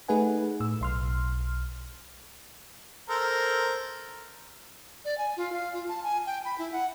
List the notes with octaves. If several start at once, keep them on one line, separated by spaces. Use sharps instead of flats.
A3 D#4 G#4 B4 F#5 G#5
A2 E6
B1 C6 F6
A4 A#4 C5
D5
G#5
F4
F5
F4
A5
G#5
G5
B5
E4
F#5